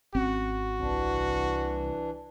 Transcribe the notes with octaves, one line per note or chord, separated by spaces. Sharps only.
G#1 C4 C#4 F#4
C2 E3 D4